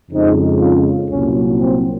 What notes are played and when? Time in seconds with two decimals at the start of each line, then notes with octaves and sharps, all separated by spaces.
0.11 F2 C#3 G#3 C4 D#4
0.61 C#4 F4
1.10 C2 A#2 F#3 C#4
1.59 C4